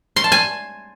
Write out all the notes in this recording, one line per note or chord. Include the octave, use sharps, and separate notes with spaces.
C6
A5
G#5